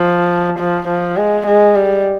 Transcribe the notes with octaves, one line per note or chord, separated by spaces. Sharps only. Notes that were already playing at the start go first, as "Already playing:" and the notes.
Already playing: F3
F3
F3
G#3
G#3
G3